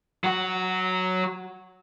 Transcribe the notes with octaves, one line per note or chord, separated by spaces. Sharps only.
F#3 F#4